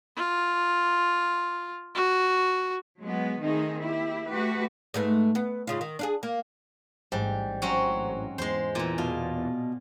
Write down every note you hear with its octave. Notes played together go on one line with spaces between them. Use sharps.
F4
F#4
F#3 G#3 B3
D#3 A3 C4 D#4 G#4
A#3 E4 G4
A3 F#4 G4 B4
G#2 A3 B3
B3
G#2 C#3 F4
D#3
D4 F4 G#4
A#3
A1 G#2 G3
F#3 C4 C#4
E2 G#3 C5
A#2 E3
B2 F4